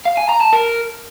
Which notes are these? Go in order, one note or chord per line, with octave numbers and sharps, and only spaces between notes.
F5
G#5
A#5
A5
A#4